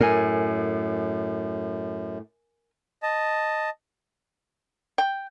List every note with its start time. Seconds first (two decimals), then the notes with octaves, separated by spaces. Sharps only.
0.01 F#2 A2 A#4 G#5
3.03 D#5 A5
4.98 G5